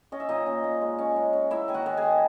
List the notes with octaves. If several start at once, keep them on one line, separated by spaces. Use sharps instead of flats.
C#4 D#5
E5
A#2 D#4 D#5
C#4
A#2
G#3
C#4
G#3
C#4
A#3 E4 E5
D#3 G#5
F#4 F#5
D#3
G#4 G#5
D#3